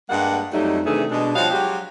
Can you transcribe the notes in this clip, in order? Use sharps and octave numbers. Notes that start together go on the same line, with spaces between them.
G2 G3 G#3 A#3 F#5
F2 F#3 G3 A3 D#4
C3 D#3 E3 A3 D4 G#4
B2 G#3 D4
F3 G3 F#4 C#5 D#5 F5
F#3 G#3 F#4 G4